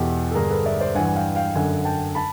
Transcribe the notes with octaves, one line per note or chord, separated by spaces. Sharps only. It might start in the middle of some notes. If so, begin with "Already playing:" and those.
Already playing: E2 B2 G4 A4
A4
G2 D3 G#4 A#4
A4 B4
D5 E5
C5 D5
G2 E3 F#5 G#5
G#5
F5 G5
F5 G5
F#2 D3 F#5 G#5
G5 A5
A5 B5